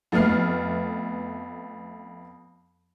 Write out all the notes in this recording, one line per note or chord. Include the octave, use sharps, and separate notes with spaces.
F2 A3 B3 F6 C7